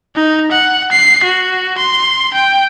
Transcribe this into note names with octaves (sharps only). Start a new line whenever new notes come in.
D#4
F#5
C7
F#4
C6
G5